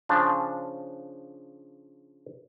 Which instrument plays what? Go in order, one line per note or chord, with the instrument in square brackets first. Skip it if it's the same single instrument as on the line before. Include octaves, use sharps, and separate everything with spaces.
[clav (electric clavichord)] C#3 F3 D4